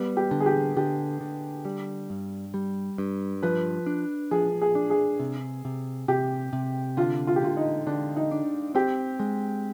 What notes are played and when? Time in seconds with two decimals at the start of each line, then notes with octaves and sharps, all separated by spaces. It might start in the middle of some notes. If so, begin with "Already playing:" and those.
Already playing: G3 B3
0.17 G4
0.31 D3
0.40 G#4
0.46 G4
0.77 D3 G4
1.21 D3
1.65 G3
2.10 G2
2.54 G3
2.98 G2
3.43 F3 B4
3.86 D4
4.31 F3 G#4
4.62 G#4
4.75 D4
4.90 G#4
5.20 C3
5.65 C3
6.08 C3 G4
6.53 C3
6.97 D3 F4
7.27 F4
7.36 G4
7.42 D3 F4
7.57 D#4
7.87 D3 D4
8.16 D#4
8.31 D4
8.75 C4 G4
9.20 G#3